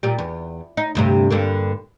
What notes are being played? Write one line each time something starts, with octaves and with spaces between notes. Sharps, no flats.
A#2 G3
E2
D#4
D2 G2 C3
G2 D3 A#3